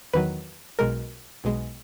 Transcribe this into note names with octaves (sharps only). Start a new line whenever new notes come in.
E2 D#3 F#3 B4
B1 B2 G#3 A#4
B1 B2 G#3